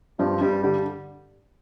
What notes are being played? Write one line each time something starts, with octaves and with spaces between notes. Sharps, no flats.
G2 F3
G2 G3
D3 G3